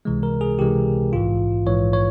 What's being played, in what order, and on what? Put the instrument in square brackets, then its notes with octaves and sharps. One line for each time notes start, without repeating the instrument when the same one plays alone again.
[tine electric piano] C#2 C3 E3 G#3
A#4
G#4
C#2 C3 E3 G#3 G4
A#1 G#2 E3 F4
A#1 G#2 E3 C#5
C#5